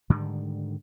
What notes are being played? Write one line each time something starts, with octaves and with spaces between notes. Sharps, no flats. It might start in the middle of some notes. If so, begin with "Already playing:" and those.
G#2 D3 D#3 G3